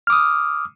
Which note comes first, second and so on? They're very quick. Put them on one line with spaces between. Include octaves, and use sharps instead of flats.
F6 D6 D#6